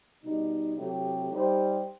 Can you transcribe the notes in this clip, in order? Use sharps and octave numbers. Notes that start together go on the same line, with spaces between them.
B2 G3 D#4
C3 F#3 A3 E4 G4
G3 D#4 G4 C5